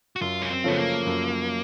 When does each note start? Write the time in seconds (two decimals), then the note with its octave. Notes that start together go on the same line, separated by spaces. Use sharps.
0.16 F#4
0.21 F#2 F4
0.42 C#4
0.50 C4
0.64 C#3 F3 A3 B3 C#4
0.79 A#3
1.06 F#2